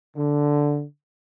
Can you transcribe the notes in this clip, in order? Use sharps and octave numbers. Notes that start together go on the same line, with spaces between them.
D3